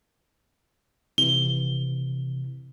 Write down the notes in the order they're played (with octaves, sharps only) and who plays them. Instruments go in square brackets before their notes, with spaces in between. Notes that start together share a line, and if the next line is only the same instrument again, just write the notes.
[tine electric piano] C3 E3 [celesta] G7